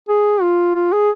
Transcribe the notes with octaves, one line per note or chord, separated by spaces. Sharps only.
G#4
F4
F4
G#4